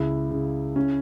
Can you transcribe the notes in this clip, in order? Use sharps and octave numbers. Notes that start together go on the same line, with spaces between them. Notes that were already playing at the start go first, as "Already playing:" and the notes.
Already playing: C#2 C#3 E4
C#3
C#4